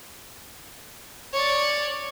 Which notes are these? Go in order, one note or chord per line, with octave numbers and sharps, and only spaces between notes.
C#5 D5